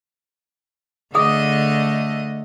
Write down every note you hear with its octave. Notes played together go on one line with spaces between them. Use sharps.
D3 A3 G#4 D#5 F#5 D#6